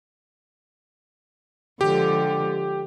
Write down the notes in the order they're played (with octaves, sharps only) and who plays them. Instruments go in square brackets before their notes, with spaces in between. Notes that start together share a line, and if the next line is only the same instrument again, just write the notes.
[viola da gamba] D3 F3 G#3 [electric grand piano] G4